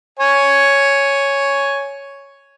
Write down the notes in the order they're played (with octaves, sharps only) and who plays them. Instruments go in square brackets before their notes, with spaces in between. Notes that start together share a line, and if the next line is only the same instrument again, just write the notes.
[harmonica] C#5 G#5